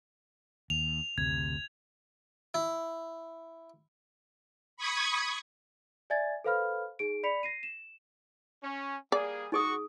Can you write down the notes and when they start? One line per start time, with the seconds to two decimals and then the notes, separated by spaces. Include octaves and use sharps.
0.70 D#2 F7
1.18 F#1 D2 C3 G#6
2.54 E4
4.77 B5 C#6 D#6 G#6
6.10 D5 E5 G#5 G#6 A6
6.44 A4 B4 C5 F5 B5 F6
6.99 D#4 G#4 D7
7.23 D5 B5 B6 C#7 F7
7.43 A#6 C7 D#7
7.63 E7
8.63 C#4
9.12 G3 A#3 G#4 D5
9.52 D#4 F#4 G#4 C#6 D#6